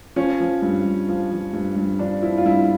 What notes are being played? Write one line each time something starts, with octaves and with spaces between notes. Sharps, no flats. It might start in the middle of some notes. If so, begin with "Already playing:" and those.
F3 C#4
F3
G2
G2
F3
F3
G2
G2
F3 D4
F3 E4
F4
G2 E4